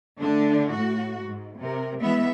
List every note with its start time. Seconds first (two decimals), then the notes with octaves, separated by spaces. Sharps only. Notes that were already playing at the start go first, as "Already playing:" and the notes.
0.20 D3 A3 D4
0.71 A2 F#4
1.25 G#2
1.59 C3 A#4
2.00 E3 G#3 B3 E5